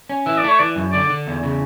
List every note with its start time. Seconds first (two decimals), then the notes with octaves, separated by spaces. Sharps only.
0.10 C#4
0.26 E3 E5
0.38 D5
0.44 A3 C#5
0.59 E3 D5
0.76 F#2
0.93 D3 D5
1.10 D3
1.27 E2
1.43 C#3